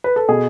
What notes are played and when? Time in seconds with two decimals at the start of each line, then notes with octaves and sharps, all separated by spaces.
0.04 B4
0.16 A4
0.28 B2 G#4